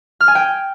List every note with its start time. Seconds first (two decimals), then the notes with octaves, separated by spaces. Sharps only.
0.21 F6
0.28 G#5
0.35 G5